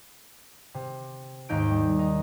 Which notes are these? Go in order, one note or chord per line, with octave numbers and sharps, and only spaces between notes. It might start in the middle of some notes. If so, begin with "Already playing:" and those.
C3
D#2 G#2 D#4 G6 D7
G3
D#4